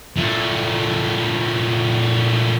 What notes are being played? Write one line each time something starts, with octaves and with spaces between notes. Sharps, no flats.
A#2 A3